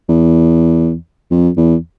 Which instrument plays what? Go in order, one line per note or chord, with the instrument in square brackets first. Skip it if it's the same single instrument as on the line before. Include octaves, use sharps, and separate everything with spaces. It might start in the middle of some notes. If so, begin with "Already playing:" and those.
[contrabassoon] E2
F2
E2